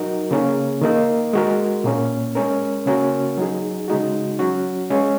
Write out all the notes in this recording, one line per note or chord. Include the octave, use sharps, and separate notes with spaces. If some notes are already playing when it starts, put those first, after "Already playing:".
Already playing: F#3 D#4 F#4 A#4
C#3 A#3 C#4 G#4
D#3 A#3 D#4 A#4
G#3 F#4 A#4
A#2 A#3 C#4
G#3 C#4 A#4
C#3 A#3 C#4 F#4 A#4
F#3 D#4 G#4
C#3 G#3 D#4 F#4
F#3 C#4 F#4
G#3 C#4 G#4